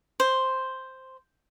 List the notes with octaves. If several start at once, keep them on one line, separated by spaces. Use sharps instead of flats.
C5